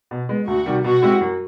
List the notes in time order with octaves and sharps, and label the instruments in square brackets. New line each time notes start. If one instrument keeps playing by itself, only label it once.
[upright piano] B2
G#3 B3
[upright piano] D2 [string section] F#4
[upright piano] C3 D#3 G3
[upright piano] B2 [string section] F#4
[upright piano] G#3 C4 E4 G4
F#2